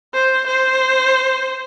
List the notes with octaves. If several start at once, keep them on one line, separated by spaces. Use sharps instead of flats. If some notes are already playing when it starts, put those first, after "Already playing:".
C5
C5